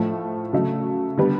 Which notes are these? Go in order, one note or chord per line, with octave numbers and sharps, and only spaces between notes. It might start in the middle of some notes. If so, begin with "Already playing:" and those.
Already playing: A2 F3 A3
C#3 F#3 A3
D3 G3 B3